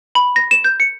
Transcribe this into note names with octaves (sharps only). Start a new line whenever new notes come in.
B5
A#6
E7
G6
C#7